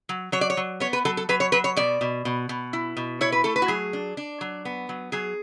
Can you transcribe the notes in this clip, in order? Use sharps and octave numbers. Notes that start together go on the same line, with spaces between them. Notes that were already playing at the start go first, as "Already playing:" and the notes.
F#3
F#3 C#5
D5
C#5
F#3
B3 C#5
B4
F#3 A4
A4
F#3 B4
C#5
F#3 B4
C#5
B2 D5
B2
B2
B2
E4
B2
E4 C#5
B4
A3 A4
B4
F#4
F#3 G#4
D4
D4
F#3
B3
F#3
F#3 G#4